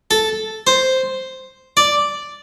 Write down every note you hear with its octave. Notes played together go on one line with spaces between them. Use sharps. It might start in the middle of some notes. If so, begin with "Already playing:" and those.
A4
C5
D5